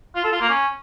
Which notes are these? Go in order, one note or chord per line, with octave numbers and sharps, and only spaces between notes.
F4
A4
F4
A#3
C#4